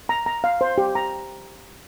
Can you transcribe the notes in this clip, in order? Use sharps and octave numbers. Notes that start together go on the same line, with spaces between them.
A#5
A#5
F5
C5
G4
A#5